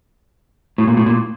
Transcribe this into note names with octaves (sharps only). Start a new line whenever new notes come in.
A2
A#2
A2
A#2